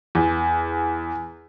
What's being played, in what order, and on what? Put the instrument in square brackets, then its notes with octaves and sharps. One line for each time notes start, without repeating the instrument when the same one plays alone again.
[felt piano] E2